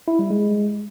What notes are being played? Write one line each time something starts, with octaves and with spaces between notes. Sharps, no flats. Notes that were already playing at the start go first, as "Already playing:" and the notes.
E4
G3
G#3